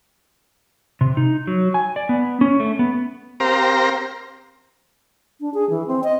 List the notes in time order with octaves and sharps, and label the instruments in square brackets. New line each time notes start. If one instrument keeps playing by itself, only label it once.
[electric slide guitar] C3
D#4
F#3
G#5
D5
B3
C#4
A3
B3
[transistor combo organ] C4 G4 A#4 C5 F5 A#5
[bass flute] D4
G#4
E3
C4
D#5